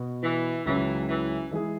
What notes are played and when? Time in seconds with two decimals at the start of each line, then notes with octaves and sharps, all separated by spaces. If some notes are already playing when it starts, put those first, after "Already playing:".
Already playing: B2 B3 F#4
0.23 E3
0.65 C#2 C#3 E3 F#3 C#4
1.08 E3
1.51 E3 G#3 E4 G#4